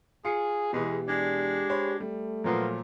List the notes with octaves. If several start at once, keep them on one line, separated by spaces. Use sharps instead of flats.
F4 G#4 C7 C#7
E2 B2 E3 G#3 G4 G#4
G#3 D4
C5 C#5 B5
G3 A3
A#2 F3 F#3 A#3 B3 F4